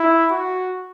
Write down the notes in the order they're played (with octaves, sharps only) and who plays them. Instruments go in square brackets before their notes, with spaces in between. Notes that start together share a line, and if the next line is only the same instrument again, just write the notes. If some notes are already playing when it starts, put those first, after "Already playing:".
Already playing: [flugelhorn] E4
F#4